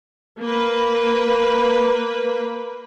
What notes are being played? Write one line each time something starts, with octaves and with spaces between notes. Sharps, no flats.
A#3 B4